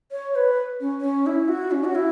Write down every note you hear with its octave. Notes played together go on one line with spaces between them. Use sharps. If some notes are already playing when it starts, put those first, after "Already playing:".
C#5
B4
C#4
C#4
E4
F#4
C#4
F#4
E4